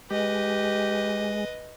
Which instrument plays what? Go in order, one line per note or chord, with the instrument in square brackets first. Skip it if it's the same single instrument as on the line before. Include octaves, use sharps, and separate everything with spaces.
[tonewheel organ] G#3 [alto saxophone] G4 [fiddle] B4 D#5